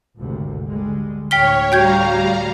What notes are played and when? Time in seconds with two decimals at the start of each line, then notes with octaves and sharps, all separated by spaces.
0.18 G#1 D2 C3
0.69 D3 G3 G#3
1.31 D2 A2 C#5 G5 F6 B6 G7
1.72 G3 F#4 F5 G5 A#5 G6 G#6